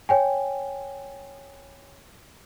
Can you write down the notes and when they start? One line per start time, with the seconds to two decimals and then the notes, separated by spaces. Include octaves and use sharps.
0.09 C#5 G5 G#5